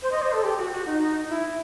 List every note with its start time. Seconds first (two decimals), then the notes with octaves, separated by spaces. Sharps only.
0.02 C5
0.12 D#5
0.22 C5
0.33 A4
0.44 G4
0.58 F#4
0.72 F#4
0.86 D#4
1.29 E4